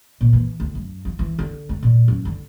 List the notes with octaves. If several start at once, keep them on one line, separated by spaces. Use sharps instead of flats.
A#2
E3
D2
F#2
F3
E3
D3
A3
A#2
F#2
D3